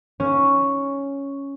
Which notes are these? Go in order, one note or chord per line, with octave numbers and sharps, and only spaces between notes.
C#4